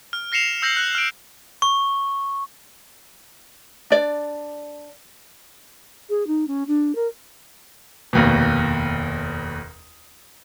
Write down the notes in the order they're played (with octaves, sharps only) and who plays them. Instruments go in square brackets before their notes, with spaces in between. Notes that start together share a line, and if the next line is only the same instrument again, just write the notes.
[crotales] F6
F6 A#6 C7 C#7 E7 F7
E6 G6 A#6 C7 F7 F#7
F#6
F6 D7
[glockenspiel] C#6
[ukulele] D4 D5
[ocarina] G#4
D#4
C#4
D4
A#4
[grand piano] F1 D#2 B2